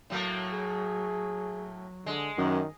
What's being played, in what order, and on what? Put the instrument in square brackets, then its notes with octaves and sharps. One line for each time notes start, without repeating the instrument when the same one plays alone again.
[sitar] A2 A3 A#3 [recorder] F#3
[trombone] G#4
[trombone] D3 [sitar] G#3
[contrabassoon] F#2 [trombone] D#3